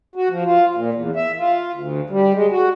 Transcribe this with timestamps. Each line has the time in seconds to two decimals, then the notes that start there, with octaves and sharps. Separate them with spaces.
0.15 F#4
0.30 F3
0.45 F4
0.75 A#2
0.94 E2
1.16 E5
1.39 F4
1.74 D2
2.10 G3
2.34 G#3
2.51 F#4